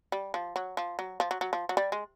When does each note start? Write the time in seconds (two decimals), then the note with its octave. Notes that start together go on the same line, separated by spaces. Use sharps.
0.12 G3
0.34 F3
0.56 F#3
0.77 F3
0.99 F#3
1.20 F3
1.31 F#3
1.41 F#3
1.53 F3
1.69 F#3
1.77 G3
1.92 G#3